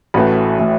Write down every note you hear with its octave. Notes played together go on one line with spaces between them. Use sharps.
A1 A2 E3 A3 F#4 B4
A2 E3 A3